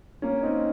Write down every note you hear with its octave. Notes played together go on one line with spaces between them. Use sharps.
A#3 C#4
C4 D#4